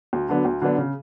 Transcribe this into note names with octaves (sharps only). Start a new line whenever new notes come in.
D2
D3 F#3 B3 D4
D2
D3 F#3 B3 D4
C#3